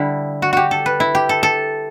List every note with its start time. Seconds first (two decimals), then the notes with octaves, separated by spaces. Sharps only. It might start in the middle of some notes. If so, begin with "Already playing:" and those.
Already playing: D3 G3 E4
0.42 F#4
0.53 F#4 G4
0.71 A4
0.86 B4
1.00 E4
1.15 G4
1.29 A4
1.43 A4